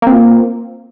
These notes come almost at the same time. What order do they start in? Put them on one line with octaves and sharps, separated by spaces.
A#3 C4 F4